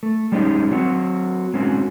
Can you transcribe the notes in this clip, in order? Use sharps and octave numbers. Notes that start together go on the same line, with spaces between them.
A3
G3 G#3 C#4 D#4 G4
F#3 C4 F#4
G#3 C4 C#4 F#4